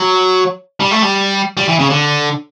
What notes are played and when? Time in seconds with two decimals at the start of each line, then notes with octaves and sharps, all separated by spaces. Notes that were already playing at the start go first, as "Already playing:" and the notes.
Already playing: F#3
0.80 G3
0.91 A3
1.02 G3
1.57 G3
1.68 E3
1.79 C#3
1.90 D3